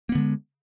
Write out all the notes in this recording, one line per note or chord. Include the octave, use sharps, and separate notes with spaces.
D3 G#3 A#3 B3